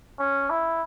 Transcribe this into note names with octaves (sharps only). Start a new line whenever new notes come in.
C#4
E4